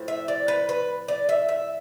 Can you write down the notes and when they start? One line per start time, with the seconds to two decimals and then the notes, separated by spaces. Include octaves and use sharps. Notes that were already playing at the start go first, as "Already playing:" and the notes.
Already playing: A2 F3 C4 E4
0.08 E5
0.28 D5
0.48 B4
0.69 B4
1.08 D5
1.29 E5
1.49 E5